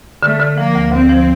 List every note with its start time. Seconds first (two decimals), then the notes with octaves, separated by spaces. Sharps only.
0.23 D3 A3
0.40 D3
0.57 F3 A#3
0.75 D2
0.92 D2 C4
1.09 F3